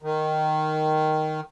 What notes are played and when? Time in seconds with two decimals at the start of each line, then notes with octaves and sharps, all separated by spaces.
0.02 D#3